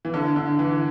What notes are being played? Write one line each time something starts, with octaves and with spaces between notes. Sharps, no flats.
E3
D3
D3
E3